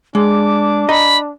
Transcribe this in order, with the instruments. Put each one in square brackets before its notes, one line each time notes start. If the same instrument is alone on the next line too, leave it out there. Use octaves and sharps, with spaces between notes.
[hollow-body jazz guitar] G#3 [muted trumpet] D4 [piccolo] D6
[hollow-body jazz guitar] D#5 A#5 [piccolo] B5